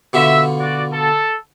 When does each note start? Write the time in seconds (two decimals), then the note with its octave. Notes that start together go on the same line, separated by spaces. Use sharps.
0.13 B2 D3 F4 E5
0.59 F#4 D5
0.92 A4